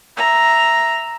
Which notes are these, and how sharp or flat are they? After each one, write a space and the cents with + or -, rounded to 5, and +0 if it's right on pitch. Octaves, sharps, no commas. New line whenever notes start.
E5 +0 A#5 +0